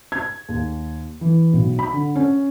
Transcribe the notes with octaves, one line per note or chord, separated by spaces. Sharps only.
G#6
D#2
E3
B1
B5
D3
C#4